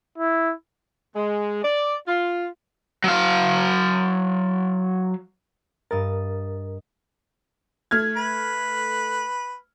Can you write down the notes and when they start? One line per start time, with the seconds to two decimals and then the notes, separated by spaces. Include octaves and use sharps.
0.18 E4
1.16 G#3
1.64 D5
2.08 F4
3.04 F#3 F5
5.91 G2 A#4 D#5 A6
7.91 A3 F6 G#6
8.17 B4